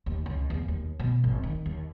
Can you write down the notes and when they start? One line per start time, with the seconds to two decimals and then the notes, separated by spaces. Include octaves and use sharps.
0.06 D#2
0.26 C#2
0.50 E2
0.68 D#2
0.99 B2
1.24 G#1
1.43 D#3
1.66 D#2